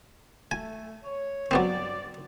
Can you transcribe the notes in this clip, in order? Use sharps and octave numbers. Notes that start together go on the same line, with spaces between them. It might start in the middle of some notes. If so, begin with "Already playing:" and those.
A3 G#5
C#5
G2 F#3 B3 C4 D5